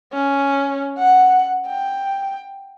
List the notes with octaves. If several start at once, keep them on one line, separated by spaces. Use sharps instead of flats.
C#4
F#5
G5